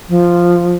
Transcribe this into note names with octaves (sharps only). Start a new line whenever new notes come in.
F3